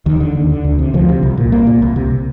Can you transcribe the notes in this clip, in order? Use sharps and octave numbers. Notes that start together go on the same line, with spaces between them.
D#2 D#3
D3
D#2
D3
D2
C3
D2 F3
C3
C2
A#2
C2 A#3
A#2
C2
C3